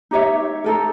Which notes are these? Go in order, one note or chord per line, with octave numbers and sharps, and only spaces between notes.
D#4 G4 C#5 E5
D#4 A4 A#4